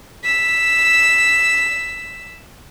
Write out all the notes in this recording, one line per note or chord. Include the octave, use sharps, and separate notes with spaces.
E6 B6